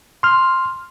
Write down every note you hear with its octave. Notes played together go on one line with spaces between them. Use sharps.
C6 F6